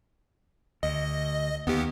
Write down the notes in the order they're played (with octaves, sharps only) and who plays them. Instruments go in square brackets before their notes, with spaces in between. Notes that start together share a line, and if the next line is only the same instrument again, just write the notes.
[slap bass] D2 [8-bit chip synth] D#5
[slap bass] D#2 [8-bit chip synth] B3 G4